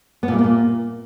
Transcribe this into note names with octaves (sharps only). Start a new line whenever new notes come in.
B3
A#2
G3
A#3
A#2